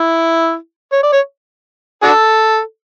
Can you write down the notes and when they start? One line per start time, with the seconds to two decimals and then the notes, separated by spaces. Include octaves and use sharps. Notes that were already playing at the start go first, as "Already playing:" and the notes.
Already playing: E4
0.92 C#5
1.03 D5
1.13 C#5
2.03 D4 F#4 A4